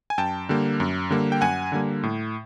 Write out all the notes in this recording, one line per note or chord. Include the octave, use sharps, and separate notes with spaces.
G#5
F#2 G5 A5
D3 G3 A#3
F#2
D3 G3 A#3
G5
F#2 F#5 G#5
D3 G3 A#3
A2